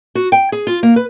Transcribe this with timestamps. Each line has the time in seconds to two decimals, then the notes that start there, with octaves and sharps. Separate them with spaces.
0.15 F#4
0.32 G5
0.52 G#4
0.67 F4
0.83 A#3
0.96 B4